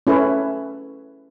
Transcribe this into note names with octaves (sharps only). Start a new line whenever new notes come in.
C#4 E4 A4 B4